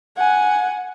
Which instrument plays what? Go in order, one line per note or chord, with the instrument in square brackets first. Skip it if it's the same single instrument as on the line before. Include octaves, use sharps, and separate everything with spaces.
[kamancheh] F#5 G#5